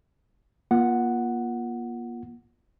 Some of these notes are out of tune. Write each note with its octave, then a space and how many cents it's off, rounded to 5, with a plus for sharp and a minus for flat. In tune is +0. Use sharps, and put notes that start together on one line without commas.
A#3 +35 F4 -5 F#5 +0